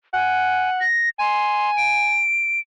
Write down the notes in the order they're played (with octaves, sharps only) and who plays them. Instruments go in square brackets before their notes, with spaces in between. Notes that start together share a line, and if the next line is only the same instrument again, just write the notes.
[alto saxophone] F#5 [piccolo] G#5
[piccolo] A#6
[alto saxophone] G#5 [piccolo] C6
[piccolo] D7